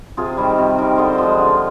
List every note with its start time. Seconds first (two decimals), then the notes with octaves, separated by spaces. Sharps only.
0.17 C3 F4 G#4
0.37 D#3 G3
0.58 C3
0.78 D#3 G3
0.98 D3 C5 D#5
1.18 F3 G#3
1.39 D3